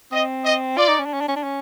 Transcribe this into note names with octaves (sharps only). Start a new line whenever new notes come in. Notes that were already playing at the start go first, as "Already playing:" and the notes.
C4 D#5
D#5
F4 D5
D#4
C#4
D4
C#4
D4
C#4
D4
C#4